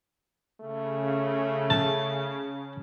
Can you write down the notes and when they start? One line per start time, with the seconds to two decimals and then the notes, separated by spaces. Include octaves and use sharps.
0.61 C#3 A3
1.70 A5